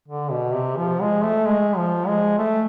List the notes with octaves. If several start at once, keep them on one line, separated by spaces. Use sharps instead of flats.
D3
B2
C3
F3
G#3
A3
G#3
F3
G#3
A3